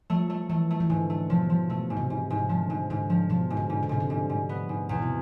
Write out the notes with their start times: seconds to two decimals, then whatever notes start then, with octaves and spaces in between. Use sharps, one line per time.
0.10 F3 A3
0.30 A3
0.50 E3 A3
0.70 A3
0.80 E3
0.89 G#2 D3
1.10 A3
1.30 B2 F3
1.50 F3
1.70 B2 A3
1.90 G#2
1.97 C3
2.10 G#2
2.30 G#2
2.38 C3
2.49 D3 F3
2.70 G#2
2.90 G#2 D3
3.10 F3
3.30 B2 F3
3.50 G#2
3.57 D3
3.70 G#2
3.83 D3
3.89 G#2 C3
4.00 D3
4.10 G#2
4.29 G#2
4.49 B3
4.69 G#2
4.89 E2 B2
5.02 C3